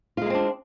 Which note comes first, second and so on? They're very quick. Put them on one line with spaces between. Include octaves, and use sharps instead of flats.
F4 G#3 A#3 C4 D4